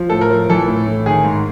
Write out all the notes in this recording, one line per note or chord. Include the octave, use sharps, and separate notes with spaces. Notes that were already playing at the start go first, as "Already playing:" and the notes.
Already playing: F3
A2 A4
A#4
F3
E3 A4
A2
A2
D#3 G#4
G#2